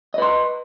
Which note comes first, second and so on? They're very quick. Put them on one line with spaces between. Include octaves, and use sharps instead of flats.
D#5 B4 C6